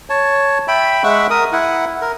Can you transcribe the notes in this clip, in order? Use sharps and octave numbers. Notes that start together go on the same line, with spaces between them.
C#5 A5
E5 G5 B5
G#3 E5 F#5 C#6
A#4 D#6
E4 F#5
A#4